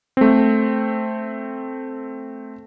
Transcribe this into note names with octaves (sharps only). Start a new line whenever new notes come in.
A3 C4